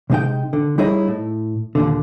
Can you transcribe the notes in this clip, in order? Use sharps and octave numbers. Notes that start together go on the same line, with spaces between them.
C3 G#3 D#4 G5
D3
G3 D#4 E4 G#4 C#5 D#5
A2
D#2 A#2 D3